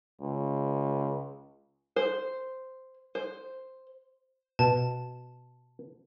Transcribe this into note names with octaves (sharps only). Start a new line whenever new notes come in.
C#2
C5
C5
B2 A5